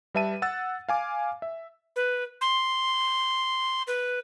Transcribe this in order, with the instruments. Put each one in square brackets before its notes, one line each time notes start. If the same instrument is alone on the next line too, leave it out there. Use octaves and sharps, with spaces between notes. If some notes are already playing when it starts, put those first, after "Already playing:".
[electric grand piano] G3 B4 E5 A5 D#7
F#5 E6 A6
F5 G#5 D6
E5
[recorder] B4
C6
B4